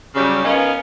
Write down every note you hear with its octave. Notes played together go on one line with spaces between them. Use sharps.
C#3 F#3 G3
B3 C#4 D#4 F4 A#4 B4